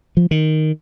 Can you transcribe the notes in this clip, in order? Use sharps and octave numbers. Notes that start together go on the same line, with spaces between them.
F3
D#3